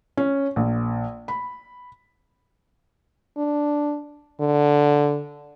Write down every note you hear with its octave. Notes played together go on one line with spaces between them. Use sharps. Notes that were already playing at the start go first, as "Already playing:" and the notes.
C#4
A#1
B5
D4
D3